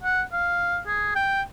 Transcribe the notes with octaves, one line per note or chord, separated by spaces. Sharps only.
F#5
F5
G#4
G5